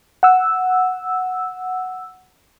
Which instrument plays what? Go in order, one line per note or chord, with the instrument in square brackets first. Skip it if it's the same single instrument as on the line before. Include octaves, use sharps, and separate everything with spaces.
[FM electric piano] F#5 E6